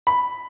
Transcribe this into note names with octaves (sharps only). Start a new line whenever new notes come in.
B5